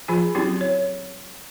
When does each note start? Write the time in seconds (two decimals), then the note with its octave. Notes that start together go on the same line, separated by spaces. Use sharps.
0.08 F3 F4 G#4 G#5
0.35 F#3 C4 C#4 E4 F#4 G4
0.61 C#5